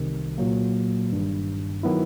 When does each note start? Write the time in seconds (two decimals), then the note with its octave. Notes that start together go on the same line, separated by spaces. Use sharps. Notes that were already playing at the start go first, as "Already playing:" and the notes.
Already playing: C2 C3 D#3
0.38 A#2 F#3 A#3
1.11 G1 G2 D#3
1.83 D#3 F#3 B3 E4